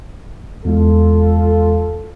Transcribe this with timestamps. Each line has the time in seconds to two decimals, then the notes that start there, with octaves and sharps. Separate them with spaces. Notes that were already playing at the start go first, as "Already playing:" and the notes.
0.65 E2 G#3 F4 A4